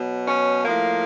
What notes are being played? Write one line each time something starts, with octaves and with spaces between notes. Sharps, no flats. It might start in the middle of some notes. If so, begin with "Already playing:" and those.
Already playing: B2 F#3
C#4
A2 F3 A#3